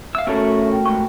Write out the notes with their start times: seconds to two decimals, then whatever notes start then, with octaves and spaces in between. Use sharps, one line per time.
0.15 E5 F5 E6
0.27 B2 A3 C#4 F#4 A4 A#4
0.72 G5
0.86 G#2 B2 C#6